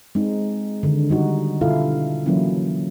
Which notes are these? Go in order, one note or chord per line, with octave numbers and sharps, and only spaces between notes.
G#3 C4 D#4
D3 D#3
D3 G3 D#4 F#4
B2 D3 E4 F4 A4 F5
E3 F#3 A#3 C#4 E4